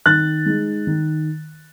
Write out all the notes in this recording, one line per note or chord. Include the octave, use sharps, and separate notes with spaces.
D#3 F#6 A6
G#3 D#4
D#3